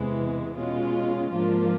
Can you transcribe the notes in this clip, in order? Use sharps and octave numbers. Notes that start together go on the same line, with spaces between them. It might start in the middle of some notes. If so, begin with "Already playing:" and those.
Already playing: E2 C3 E3 G#3 B3
B2 G#3 C#4 F4
G#2 F3 A#3 D4 F4